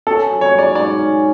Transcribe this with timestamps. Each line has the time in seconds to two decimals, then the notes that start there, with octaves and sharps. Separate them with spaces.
0.07 C#4 A4
0.30 F#3
0.41 C#5
0.53 G#2
0.58 D5
0.75 G#2 D5
0.98 C#4